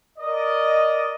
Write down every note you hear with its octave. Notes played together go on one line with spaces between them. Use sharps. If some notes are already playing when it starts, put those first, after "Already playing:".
A#4 D5 D#5